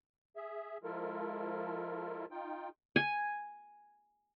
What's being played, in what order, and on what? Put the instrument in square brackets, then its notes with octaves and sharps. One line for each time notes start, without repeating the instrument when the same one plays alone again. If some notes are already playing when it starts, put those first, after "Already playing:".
[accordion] G#4 E5
F3 G#3 E4 F4 A4 A#4
D#4 F4 G5
[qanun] G#5